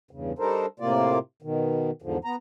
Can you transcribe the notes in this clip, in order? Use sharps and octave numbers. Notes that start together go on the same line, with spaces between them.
E2 G2 C#3
G3 D4 D#4 A4 A#4 C5
A2 C3 A#3 F4 D5
B2 D#3
E2 G#2 D3 F3
B3 A#5